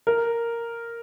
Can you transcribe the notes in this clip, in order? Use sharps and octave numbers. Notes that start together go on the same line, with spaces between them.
A#4